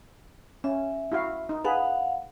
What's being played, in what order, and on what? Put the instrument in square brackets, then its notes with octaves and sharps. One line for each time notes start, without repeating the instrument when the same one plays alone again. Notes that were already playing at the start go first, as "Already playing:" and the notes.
[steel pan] C#4 [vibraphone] E5
[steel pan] E4 F#4 F5
D#4
[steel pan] G#4 B4 [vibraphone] F5 F#5